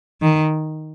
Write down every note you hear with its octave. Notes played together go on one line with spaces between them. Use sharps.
D#3